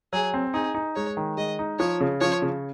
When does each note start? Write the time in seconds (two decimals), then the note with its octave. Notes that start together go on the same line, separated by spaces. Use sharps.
0.13 F#3 G#4
0.34 C4
0.54 D#4 G#4
0.74 D#4
0.96 G#3 C#5
1.17 D#3
1.37 G#3 D#5
1.59 D#4
1.79 F3 C#5
2.01 C#3
2.21 F3 C#5
2.42 C#3